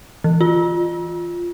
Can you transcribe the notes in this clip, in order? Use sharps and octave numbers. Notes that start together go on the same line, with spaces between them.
E3
F4